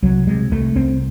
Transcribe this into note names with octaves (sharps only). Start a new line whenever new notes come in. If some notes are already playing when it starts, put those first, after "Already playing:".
C2 F#3
C3 G#3
C2 A3
C2 C4